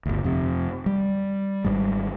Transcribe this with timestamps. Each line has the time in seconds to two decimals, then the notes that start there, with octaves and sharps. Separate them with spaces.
0.06 G1 D2
0.24 F2 C3
0.86 G3
1.65 G#1 G#2 G3